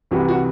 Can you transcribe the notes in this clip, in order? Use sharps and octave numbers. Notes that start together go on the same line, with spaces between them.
C2 C3 E3 F#4
F#4